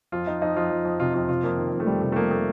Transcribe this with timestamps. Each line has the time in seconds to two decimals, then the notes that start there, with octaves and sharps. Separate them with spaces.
0.12 F2 F4
0.26 F2 D#4
0.42 F2 D#4
0.56 F2 F4
0.70 F2
0.85 F2
1.00 C3 F4
1.14 F2 F4
1.29 C3 F4
1.43 F2 A#3
1.58 D#3
1.73 F2
1.80 A3
1.87 F2 G3
2.01 C3 A3
2.12 A3
2.16 F2 A#3
2.31 A3